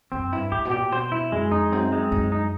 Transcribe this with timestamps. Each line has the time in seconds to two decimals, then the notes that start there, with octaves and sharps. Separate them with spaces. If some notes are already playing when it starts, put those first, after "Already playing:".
0.12 F#2 C4
0.32 G2 E4
0.52 G#2 G4
0.65 B2
0.71 A#2 G4
0.92 B2 C5
1.12 E4
1.32 F#2 G#3
1.51 F2 D#4
1.72 F#2 C4
1.92 G#3
2.12 F#2 D#4
2.32 D#4